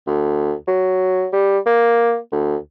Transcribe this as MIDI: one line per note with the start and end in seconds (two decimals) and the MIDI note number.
0.07 0.54 38
0.68 1.27 54
1.33 1.58 55
1.66 2.18 58
2.32 2.56 38